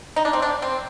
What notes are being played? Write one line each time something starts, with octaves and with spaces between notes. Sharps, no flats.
D#4
D4
C4
D4
C4